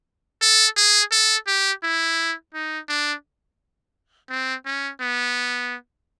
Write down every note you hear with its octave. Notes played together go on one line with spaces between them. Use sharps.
A4
G#4
A4
G4
E4
D#4
D4
C4
C#4
B3